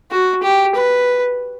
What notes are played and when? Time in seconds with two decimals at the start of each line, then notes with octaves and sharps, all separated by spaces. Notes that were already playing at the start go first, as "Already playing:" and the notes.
0.11 F#4
0.43 G4
0.75 B4